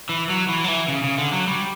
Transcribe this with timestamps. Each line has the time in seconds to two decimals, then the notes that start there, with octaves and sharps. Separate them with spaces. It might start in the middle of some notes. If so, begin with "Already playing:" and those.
0.09 E3
0.30 F#3
0.49 E3
0.64 F#3
0.68 E3
0.88 C#3
1.04 C#3
1.18 D3
1.33 F#3
1.47 G3